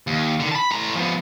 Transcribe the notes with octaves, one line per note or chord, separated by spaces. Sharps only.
D#2
D3 D#3
A5 B5
A2 A#5
F3 B3